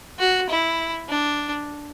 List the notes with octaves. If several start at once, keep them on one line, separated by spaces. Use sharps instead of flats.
F#4
E4
D4